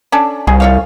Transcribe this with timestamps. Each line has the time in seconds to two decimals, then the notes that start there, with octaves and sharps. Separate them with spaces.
0.12 C#4 D4 A4
0.47 C2 G#4
0.60 F4 C#5 F5